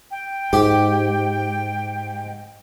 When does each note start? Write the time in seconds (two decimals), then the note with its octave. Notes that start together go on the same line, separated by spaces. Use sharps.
0.11 G5
0.53 G#2 G4